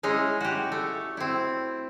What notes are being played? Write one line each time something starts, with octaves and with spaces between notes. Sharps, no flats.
G#3 C#4 D#4 E4
F#4 G4
A3
C4 E4